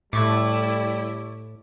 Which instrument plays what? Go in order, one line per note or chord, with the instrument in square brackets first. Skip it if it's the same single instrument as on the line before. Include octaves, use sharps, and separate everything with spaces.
[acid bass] A2 [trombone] G3 [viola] A3 E4 [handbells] C#6 D6